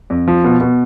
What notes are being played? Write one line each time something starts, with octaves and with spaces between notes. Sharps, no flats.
F2
F3
B2
B2